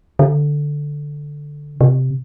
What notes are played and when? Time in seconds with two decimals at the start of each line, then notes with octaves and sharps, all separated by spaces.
0.19 D3
1.81 C3